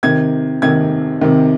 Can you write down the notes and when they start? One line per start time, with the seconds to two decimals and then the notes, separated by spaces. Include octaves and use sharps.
0.03 C3 D#3 G#6
0.62 C3 D#3 G#6
1.21 C3 D#3